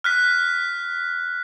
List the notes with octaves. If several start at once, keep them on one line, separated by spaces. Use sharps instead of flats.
F6 F#6 B6